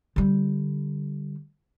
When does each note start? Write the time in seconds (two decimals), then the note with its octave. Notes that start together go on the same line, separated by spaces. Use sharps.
0.16 D3 G3